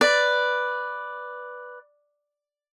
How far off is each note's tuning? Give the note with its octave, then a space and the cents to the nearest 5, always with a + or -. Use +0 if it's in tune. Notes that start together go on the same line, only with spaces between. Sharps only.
B4 +0 D5 +0